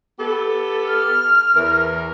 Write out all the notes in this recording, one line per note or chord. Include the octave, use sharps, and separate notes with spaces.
B3 G4 A4
F6
E2 E3 A#4